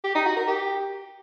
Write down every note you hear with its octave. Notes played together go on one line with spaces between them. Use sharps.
G4
D#4
F#4
A#4
G4